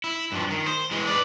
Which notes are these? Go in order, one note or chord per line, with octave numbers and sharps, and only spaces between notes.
E4
G2 F3
D#3
C5
E3 G#3
B4 D5